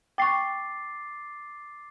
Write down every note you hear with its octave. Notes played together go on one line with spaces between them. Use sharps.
G5 C#6 D6 A6 C7